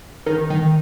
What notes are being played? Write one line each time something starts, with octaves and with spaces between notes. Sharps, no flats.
D#3
D#3